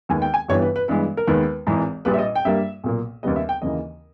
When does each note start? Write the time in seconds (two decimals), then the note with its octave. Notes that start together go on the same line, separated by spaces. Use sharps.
0.09 D#2 D#3 G#3 B3 G#5
0.22 G5
0.34 G#5
0.48 G1 G2 E3 G3 B3 C#5
0.62 B4
0.76 B4
0.88 G2 E3 G#3 B3 B4
1.17 A#4
1.27 D#2 D#3 G#3 B3 B4
1.67 G#1 G#2 E3 G#3
2.05 A#1 A#2 G3 B4
2.14 E5
2.19 D#5
2.35 G5
2.45 G2 G3 A#3 E5
2.84 B1 A#2 A#3
3.23 D#2 C#3 G3 B3 D#5
3.36 E5
3.49 G5
3.62 D#2 C#3 E3 A#3 D#5